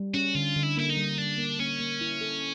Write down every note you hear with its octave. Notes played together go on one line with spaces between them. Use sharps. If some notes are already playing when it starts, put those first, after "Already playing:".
Already playing: G3
C#4 F#4
D3 F4
D3
E4
A#3 E4
D#4
G3
G3 D4
A#3
A#3 C#4
A#3
E4
A4